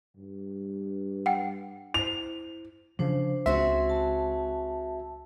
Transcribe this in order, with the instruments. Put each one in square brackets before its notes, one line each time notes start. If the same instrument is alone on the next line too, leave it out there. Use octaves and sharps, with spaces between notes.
[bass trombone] G2
[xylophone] F#5 G5
[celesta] E4 C5 [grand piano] F7
[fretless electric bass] C#3 F3 [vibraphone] D4 C5
[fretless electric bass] C#2 [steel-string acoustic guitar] C4 F#4 G#4 [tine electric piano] E5 [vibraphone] C6
[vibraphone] A5